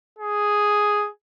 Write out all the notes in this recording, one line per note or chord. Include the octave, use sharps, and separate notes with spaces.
G#4